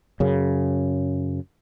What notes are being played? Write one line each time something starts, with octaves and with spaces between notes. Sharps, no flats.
F#2 C#3